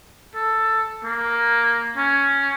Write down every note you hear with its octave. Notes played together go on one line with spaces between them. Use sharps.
A4
A#3
C#4